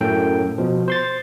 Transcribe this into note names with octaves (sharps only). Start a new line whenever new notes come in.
F#2 A2 A4 G5
B2 F3
C5 C6 A6